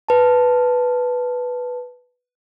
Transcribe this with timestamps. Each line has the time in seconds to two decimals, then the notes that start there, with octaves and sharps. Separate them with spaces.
0.09 B4 A5